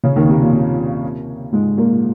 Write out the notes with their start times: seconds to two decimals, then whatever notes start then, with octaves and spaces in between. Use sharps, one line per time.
0.04 C#3 C#4
0.16 D#2 D#3
0.29 C3
0.42 A#2
0.53 C3
1.52 G#2 G#3
1.77 A#2 A#3